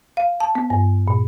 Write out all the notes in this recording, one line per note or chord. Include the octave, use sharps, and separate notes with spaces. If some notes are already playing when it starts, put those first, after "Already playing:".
F5
A5
B3
G2
A#2